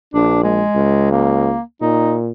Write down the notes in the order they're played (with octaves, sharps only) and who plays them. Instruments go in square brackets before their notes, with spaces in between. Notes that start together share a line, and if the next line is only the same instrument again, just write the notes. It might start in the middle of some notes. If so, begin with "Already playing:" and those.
[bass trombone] A#1 [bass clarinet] D4
[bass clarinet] G#3
[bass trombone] C#2
[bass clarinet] A#3
[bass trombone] A#2 [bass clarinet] D#4